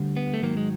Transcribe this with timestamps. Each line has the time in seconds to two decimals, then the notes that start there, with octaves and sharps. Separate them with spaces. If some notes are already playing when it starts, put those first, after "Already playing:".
Already playing: D2 D3 G3
0.17 B3
0.34 A3
0.42 G#2 D#3 F#3 A#3
0.57 G#3